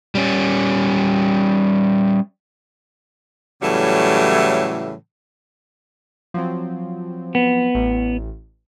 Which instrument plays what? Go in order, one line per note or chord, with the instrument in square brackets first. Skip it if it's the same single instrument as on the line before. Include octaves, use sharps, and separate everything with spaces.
[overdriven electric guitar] G3 C#4
[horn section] A2 C#3 E3 F#3 G3 A3
[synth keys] F3 F#3 C4
[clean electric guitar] B3
[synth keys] A1